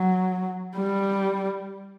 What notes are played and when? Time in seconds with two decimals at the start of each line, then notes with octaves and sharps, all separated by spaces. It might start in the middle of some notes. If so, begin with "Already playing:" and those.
Already playing: F#3
0.77 G3